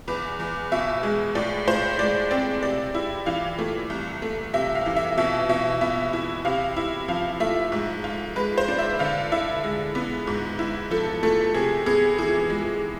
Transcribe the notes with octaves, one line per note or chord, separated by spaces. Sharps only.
E2 B4
E2
B2 E5
G#3
A2 D5
A2 C5
G#3 D5
C4 D5
C3 D5
E4
E3 F5
A3
C2
A3
C3 E5
F5
E3
E5
B2 E5
B2 E5
B3 E5
E4
C3 F5
E4
F3 F5
A3 E5
G#2
F4
G#3 B4
C5
D4
E5
D3 F5
E4 E5
G#3
B3
G#2
E4
F3 A4
A3 A4
C3 G#4
B3 G#4
E3 G#4
G#3